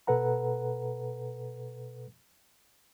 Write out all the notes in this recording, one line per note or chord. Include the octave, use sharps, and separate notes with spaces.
B2 A4 B4 F#5 A#5